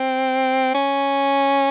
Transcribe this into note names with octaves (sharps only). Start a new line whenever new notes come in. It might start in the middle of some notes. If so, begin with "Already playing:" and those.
Already playing: C4
C#4